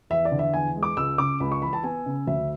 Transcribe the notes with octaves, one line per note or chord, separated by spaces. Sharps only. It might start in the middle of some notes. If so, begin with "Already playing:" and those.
E2 E5
D5
D3
E5
E2 G#5
G#3
D6
C#2 E6
C#3 D6
C#2 B5
C#6
E3 B5
A5
B3 G#5
C#3
D2 E5